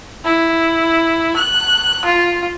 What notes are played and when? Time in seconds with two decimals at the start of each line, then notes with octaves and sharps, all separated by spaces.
0.24 E4
1.36 F#6
2.05 F4